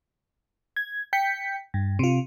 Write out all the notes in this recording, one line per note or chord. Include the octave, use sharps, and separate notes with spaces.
G#6
G5 G6 B6 C#7
G2
C3 F4